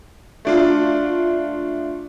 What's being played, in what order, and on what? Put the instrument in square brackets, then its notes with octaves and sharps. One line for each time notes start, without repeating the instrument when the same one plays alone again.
[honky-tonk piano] A3 D4 F4